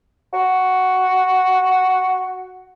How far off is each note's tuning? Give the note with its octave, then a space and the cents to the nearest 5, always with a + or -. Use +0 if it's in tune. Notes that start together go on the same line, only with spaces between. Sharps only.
F#4 +5